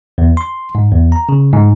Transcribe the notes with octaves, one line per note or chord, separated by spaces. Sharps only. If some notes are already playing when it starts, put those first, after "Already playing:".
E2
C6
G#2
E2
A#5
C#3
G#2